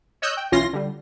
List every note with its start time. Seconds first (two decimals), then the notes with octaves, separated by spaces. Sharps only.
0.22 C#5 D#5 E6 F#6 G6
0.37 G5
0.52 B1 E3 C#4 F4 C6 A#6
0.73 D3 G3